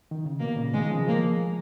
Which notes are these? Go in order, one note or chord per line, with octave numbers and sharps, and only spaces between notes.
D#3
C#3
B2 A#3
A#2 C#3
B2 D#3 G#3
C#3 F3
F3 G#3 A#3